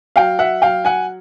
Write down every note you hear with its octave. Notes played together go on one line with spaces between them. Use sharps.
F#3 F5 G5
E5 F#5
F#3 F5 G5
F#5 G#5